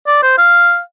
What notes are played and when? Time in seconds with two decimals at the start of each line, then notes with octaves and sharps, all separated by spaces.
0.07 D5
0.23 C5
0.38 F5